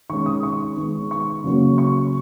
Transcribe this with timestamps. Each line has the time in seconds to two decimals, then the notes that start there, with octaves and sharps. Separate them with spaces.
0.09 D#3 G#3 C#4 C#6
0.26 D#6
0.43 C#6
0.77 D#3 G#3 B3
1.11 C#6
1.44 C#3 F#3 A#3 C#4
1.78 C#6